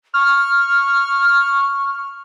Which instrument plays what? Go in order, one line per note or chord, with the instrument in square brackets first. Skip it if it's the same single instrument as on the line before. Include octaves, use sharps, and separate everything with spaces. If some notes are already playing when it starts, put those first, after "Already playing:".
[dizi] C#6 [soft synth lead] F6